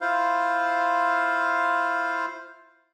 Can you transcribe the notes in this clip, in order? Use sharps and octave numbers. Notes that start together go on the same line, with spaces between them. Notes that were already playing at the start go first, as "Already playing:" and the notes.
E4 F4 C5 F5